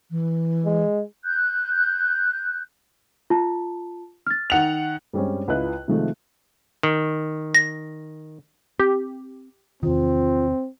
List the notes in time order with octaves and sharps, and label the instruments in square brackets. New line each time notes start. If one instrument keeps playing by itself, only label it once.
[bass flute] E3
[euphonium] G#3
[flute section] F#6 G6
[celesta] F4 A5
F6 A6
[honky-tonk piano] D#3 F#5 F7
[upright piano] G2 G3 G#3 C4 C#4
C#2 E4 F4 B4 D#5 F#6
C3 D#3 F3 G#3 A3
[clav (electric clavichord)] D#3
[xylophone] A#6
[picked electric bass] C4 [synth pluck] G4
[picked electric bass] E2 C3 D#3 [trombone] C4 [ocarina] F4